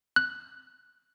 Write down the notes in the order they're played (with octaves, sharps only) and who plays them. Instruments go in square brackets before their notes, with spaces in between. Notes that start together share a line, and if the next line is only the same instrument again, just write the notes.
[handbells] F#6